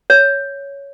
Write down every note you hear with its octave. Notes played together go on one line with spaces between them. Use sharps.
C#5